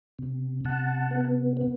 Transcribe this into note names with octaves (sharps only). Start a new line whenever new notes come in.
C3
C3 F#5 A5
B3
B3